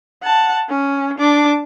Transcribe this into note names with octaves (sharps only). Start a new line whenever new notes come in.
F#5 A5
C#4
D4 D6